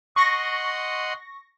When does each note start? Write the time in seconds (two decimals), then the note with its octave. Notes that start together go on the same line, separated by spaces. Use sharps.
0.16 D#5 F#5 C6 C#6 A#6